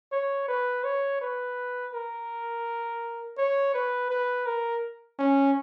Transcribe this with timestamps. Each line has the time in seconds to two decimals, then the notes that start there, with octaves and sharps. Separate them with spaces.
0.12 C#5
0.48 B4
0.84 C#5
1.21 B4
1.93 A#4
3.38 C#5
3.74 B4
4.10 B4
4.46 A#4
5.19 C#4